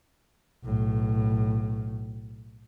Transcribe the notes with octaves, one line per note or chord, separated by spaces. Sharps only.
B1 A2